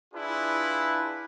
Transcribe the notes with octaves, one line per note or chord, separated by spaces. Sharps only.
D4 E4 F4 G#4 B4